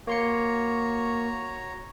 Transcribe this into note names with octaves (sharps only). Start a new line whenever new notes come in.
A#3 F#4 C#5 A#5 C6 C#7